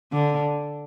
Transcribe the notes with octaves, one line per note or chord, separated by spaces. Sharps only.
D3